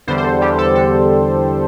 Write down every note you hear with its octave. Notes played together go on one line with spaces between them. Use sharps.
E2 D3 G3 C5
C5
A4
E2 D3 G3 G4
A4
D3 A4